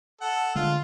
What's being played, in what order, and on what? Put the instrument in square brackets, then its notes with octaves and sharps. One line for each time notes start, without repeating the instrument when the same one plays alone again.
[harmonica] A4 F#5
[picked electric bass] D3 G#3 [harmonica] F4